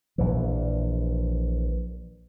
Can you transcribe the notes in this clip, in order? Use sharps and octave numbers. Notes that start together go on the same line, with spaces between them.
A#1 E3